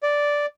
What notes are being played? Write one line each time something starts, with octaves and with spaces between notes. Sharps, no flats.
D5